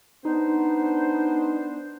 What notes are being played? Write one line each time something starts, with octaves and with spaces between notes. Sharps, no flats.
B3 D4 D#4 C5